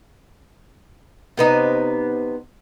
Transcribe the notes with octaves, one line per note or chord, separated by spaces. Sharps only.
C3 B3 D#4